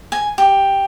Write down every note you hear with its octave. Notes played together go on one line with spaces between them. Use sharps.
G#5
G4